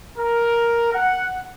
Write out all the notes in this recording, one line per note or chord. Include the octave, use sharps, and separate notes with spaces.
A#4
F#5